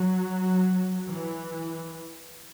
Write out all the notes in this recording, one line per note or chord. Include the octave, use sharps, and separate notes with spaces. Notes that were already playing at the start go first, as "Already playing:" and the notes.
Already playing: F#3
E3